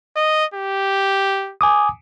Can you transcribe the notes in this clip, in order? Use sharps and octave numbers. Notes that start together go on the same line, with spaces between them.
D#5
G4
G#5 D6 D#6